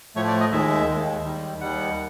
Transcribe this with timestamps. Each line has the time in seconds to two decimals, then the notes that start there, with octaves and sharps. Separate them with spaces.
0.16 A2 F3 A3 C#5
0.28 D5
0.40 D#5
0.52 D#2 D#3 G#3 E5
0.88 D#2 D#3 G#3
1.25 D#2 D#3 G3
1.61 D#2 D#3 G3 F#5